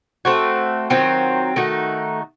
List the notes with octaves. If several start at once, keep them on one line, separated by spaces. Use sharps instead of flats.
A3 C4 F#4
D#3 F#3 C4 F4
D#3 A3 D#4 F#4